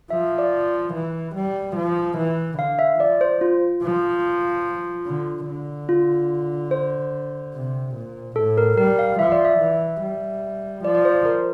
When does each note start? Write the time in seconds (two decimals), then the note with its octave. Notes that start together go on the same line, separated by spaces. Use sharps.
0.10 F3 E5
0.38 D5
0.93 E3
1.35 G3
1.76 F3
2.17 E3
2.58 D3 F5
2.79 E5
2.99 F3 D5
3.21 C5
3.41 F4
3.83 F3
5.06 D3
5.47 D3
5.89 F4
6.71 C5
7.54 C3
7.95 A#2
8.36 A2 A4
8.58 A#4
8.77 G3 A#4
8.99 F5
9.19 F3 E5
9.32 D5
9.45 E5
9.60 E3
10.01 G3
10.84 F3 D5
10.95 D5
11.05 C5
11.25 A#4